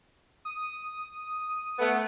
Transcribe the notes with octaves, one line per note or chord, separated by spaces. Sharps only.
D#6
A3 B3